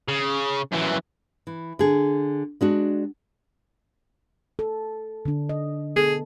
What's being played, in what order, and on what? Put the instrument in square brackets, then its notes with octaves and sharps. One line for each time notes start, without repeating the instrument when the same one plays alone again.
[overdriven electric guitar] C#3
F#2 E3
[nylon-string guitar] E3
D3 G#4
G#3 D4 F#4
[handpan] A4
D3 D4
D#5
[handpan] B3 A4 [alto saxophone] G#4